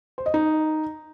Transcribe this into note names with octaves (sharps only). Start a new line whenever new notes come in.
C5
D#5
D#4